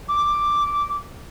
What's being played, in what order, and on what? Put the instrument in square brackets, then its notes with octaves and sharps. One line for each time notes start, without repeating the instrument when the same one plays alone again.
[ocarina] D6